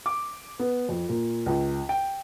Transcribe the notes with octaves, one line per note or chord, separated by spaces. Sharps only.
D6
B3
F2
A#2
C#2
G5